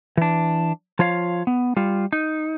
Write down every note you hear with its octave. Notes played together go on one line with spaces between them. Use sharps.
E3 D4
F3 F4 C#5 F5
B3
G3 F4
D#4